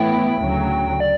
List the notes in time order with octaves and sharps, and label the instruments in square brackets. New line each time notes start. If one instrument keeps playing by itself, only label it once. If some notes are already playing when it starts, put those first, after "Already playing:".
Already playing: [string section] A2 E3 B3 E4 [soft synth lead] G5
[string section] D2 C#3 F#3
[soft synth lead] D5